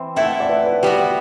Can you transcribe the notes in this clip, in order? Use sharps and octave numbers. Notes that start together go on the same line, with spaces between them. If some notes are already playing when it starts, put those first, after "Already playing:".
Already playing: E3 C4
A3 E4 A4 G5
F#5
D5
B4
B4
G3 B3 F#4 G4